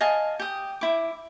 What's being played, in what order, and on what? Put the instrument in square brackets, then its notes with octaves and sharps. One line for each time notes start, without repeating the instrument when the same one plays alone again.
[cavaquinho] D#5 F5 G#5 A5
G4 D#6
E4 D6